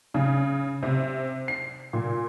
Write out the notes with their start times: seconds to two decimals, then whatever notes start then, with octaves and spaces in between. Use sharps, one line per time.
0.14 C#3
0.83 C3
1.48 C7
1.93 A#2